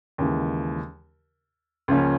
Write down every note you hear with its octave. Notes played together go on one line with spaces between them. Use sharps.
D#2 C#3 E3 G#3
C#2 C#3 F3 A#3 C#4